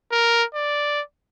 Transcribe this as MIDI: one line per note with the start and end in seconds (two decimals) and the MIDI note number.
0.12 0.43 70
0.55 1.01 74